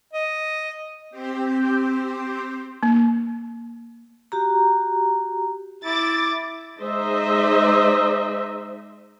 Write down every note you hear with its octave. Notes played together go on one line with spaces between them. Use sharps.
D#5
C4 G4 C5
A#3
F#4 G4 A#5
E4 D6 A6
G#3 D#4 G#4 C5 D#5 E5